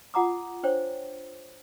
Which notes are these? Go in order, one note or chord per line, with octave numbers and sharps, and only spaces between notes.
F4 F#5 A#5 D6 D#6
D4 C5 C#5 G5